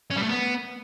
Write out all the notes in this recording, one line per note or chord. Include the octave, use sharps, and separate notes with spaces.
C#4
G3
A3
B3